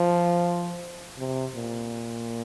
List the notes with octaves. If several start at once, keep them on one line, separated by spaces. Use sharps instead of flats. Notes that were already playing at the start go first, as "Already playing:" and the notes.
Already playing: F3
C3
A#2